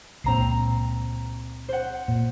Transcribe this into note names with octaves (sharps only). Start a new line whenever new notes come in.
C#2 A#2 C4 A#5 C7
C5 F#5
A#2